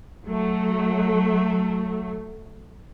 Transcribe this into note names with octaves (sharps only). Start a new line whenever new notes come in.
F#3 A3